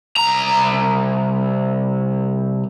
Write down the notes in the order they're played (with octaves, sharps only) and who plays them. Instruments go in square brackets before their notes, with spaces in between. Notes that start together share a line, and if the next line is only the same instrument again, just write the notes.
[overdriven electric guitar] C2 A#5